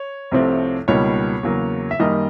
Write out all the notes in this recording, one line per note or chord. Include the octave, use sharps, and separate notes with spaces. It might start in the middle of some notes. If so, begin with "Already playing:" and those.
Already playing: C#5
C2 C3 F3 A3 C4
C#2 B2 G3 A#3 D#4 C#5
E2 C#3 F#3 A#3
E5
F#2 D#3 G3 A#3 D#5